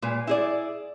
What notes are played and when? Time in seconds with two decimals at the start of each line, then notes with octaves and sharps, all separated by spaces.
0.02 A#2 G#3 B4
0.27 E4 G#4 D5